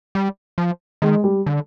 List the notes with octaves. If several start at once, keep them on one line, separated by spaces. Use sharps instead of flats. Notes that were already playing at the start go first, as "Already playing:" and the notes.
G3
F3
D#3 G#3
G3
D3